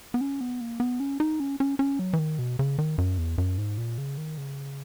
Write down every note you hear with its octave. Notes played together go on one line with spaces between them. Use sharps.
B3
C#4
B3
A#3
B3
C#4
D#4
C#4
C#4
C#4
F#3
E3
D#3
B2
C#3
D#3
F#2
E2
F#2
G#2
A#2
C#3
D#3
C#3